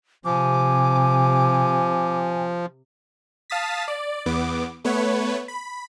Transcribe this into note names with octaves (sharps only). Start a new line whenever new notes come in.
C3 F3 G#5 D6
F5 A5 D#6 A6 B6
D5
E2 B3 D6
A3 B3 B4 C#5
B5